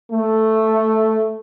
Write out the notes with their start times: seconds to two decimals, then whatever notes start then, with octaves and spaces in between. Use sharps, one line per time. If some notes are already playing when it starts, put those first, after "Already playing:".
0.12 A3